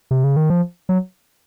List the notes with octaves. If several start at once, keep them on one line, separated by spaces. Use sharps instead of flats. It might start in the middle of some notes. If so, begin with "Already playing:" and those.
C3
C#3
D#3
F3
F#3